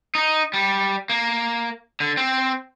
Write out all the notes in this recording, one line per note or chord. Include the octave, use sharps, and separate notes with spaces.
D#4
G3
A#3
D3
C4